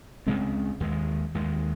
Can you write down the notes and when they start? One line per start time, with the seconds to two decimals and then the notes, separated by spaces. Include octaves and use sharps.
0.26 C#2 C#3 G#3 C4
0.80 D#2 D#3 G#3
1.35 D#2 D#3 G#3